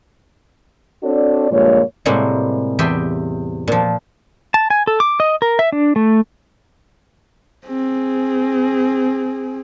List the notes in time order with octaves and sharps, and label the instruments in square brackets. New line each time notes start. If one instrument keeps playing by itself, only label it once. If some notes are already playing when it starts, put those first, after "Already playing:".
[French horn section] C4 D4 F#4 A4 C#5 D5
G2 A#2 F3 G#3 A#3 C#5
[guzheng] A2 C3 G3 G#3 A#3 F#5
E2 G4 D#5 E5 G5 C6
A#2 F3
[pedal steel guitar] A5
G#5
A4
D6
D#5
A#4
E5
D4
A3
[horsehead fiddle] C4 G#4